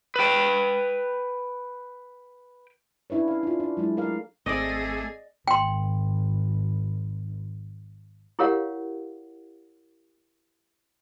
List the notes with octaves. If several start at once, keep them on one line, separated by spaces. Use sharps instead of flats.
B4 G5
C#4 D4 E4 B4 C#5
C#4 F5
D4 F4
D4
F#3 G#3 E4
A3 G#4 A#4 D5 F5
G#1 A3 C4 G#4 D5 D#5 D6
G#1 G5 C6
E4 G4 A#4 C#5 F5 F#5